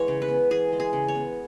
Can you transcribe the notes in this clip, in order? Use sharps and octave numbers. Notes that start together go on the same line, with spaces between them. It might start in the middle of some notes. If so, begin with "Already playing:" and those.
Already playing: E3 G#3 B3 C#5
C#3
B4
B3
E3 G#4
G#3
G#4
C#3
C#5
B3